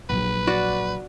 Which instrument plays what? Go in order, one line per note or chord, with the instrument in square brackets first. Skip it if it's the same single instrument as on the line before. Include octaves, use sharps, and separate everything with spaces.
[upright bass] A#1 F#3 [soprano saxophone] B4
[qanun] F#4 D5